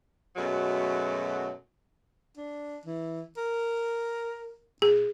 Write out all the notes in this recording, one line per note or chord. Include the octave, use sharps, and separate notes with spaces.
F#2 B2 F#3 G#3 A3
D4
E3
A#4
A#2 G#4